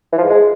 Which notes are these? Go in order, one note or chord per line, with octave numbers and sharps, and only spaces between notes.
E3
F3
G#2
G#3